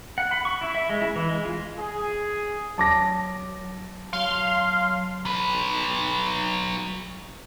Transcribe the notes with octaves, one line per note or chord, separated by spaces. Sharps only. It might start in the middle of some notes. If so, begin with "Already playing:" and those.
F#5
B5
C#6
E4
E5
G#3
E4
E3
G#3
F4
G#4
F#3 A5 D6 A#6
F#3 F5 C6
F#3 B4